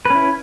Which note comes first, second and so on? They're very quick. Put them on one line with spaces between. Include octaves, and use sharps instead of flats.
B4 C#4 E4